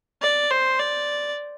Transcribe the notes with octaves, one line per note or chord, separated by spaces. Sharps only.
D5
C5
D5